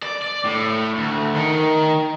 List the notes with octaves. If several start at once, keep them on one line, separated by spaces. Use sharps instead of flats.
D5
D5
A2
D2
D#3